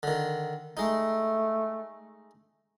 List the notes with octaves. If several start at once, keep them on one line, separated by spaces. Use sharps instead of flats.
D3 D#3
G#3 A3 D#4